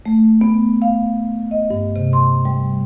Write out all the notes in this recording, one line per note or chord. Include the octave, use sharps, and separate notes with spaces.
A3
B3
F5
D#5
G2
C3
C6
G3